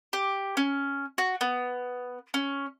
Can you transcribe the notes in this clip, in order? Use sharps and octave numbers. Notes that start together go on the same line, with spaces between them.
G4
C#4
F#4
B3
C#4